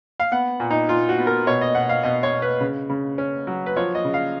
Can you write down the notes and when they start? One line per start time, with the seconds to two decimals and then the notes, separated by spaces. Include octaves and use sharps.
0.20 F5
0.32 B3 F#5
0.60 A#2
0.71 D#4
0.89 A#2 F4
1.09 F#4
1.18 B3
1.27 A#4
1.47 B2 C#5
1.61 D#5
1.75 B2 F#5
1.89 F5
2.04 B2 D#5
2.23 C#5
2.33 B2
2.42 B4
2.61 C#3
2.90 C#3
3.18 C#4
3.47 F#3
3.66 B4
3.77 F3 C#5
3.95 D#5
4.05 C#3
4.14 F5